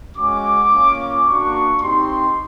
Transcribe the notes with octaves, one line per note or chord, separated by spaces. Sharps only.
G#3 C#4 F#4 D6
A#3 C#4 F4
A#3 D4 F#4 C#6
C4 D#4 G4 C6